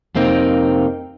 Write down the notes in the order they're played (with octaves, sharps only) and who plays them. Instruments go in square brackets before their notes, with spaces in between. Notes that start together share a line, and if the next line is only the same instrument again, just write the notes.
[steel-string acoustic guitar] F2 C3 A#3 C4 D#4